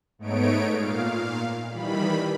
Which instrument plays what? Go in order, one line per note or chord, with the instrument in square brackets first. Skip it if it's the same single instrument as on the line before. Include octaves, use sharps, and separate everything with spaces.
[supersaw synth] G#2 A3 B3 D#4 C#5 D7
A#2 F5
D#3 E3 G3 B5